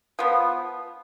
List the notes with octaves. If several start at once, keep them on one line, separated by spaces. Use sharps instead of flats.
F3 B3